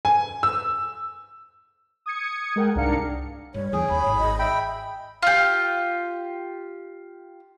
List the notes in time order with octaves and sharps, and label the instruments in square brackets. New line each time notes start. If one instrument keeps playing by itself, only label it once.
[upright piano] G#5
E6
[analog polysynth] D#6 G#6 C#7
G#3 A#4 F#5 G5
C2 G#2 D4 A#4 F5 C#7
[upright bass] G2 [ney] C#5
[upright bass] E2 D3 [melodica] G#4 [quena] G5
[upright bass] D#2 C4 [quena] B5
[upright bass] G#1 C4
[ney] D#5
[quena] E5 [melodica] G5 B5
[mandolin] F4 G4